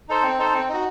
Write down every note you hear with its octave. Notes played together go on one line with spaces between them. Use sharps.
D#4 A4 C5
C4
D#4 A4 C5
C4
D#4 F#4